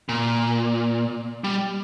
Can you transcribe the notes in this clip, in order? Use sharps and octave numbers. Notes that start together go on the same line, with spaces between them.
A#2
G3